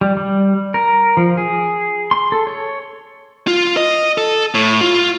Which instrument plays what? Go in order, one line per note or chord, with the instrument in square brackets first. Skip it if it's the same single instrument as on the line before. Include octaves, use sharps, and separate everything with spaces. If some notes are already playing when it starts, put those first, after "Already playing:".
[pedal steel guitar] G3
G3
A#4
F3
G#4
C6
A4
C#5
[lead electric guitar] F4
D#5
A4
A2
F4